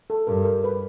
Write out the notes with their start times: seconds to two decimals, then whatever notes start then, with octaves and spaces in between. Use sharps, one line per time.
0.10 A4
0.27 G2 A#4
0.45 A#4
0.64 B4